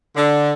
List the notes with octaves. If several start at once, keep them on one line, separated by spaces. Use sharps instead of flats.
D3